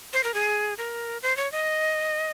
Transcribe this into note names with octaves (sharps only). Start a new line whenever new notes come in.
C5
A#4
G#4
A#4
C5
C#5
D#5